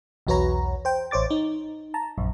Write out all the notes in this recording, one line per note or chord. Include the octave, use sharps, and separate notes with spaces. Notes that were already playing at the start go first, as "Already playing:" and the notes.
B1 E2 F#4 B4 C#5 A#5
C5 G5
A1 C5 C#5 D6 A6
D#4
A5 A#5
A#1 F#2